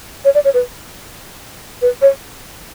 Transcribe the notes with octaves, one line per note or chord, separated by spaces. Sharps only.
C#5
D5
C#5
B4
B4
C#5